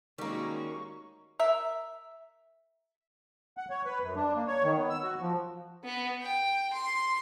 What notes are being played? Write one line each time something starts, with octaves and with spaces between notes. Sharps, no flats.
D#3 G3 G#3 A#3 C#4 F#4 C#6
A#4 E5
F#5
C#5
B4
F#2
D4
A#3
C#5
D#3
B3
E6
F#4
F3
B3
G5
C6